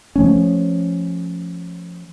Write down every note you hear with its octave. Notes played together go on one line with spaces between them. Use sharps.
F3 A3 C#4